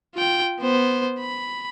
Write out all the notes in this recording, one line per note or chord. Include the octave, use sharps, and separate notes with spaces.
F4 G5
B3 C5
B5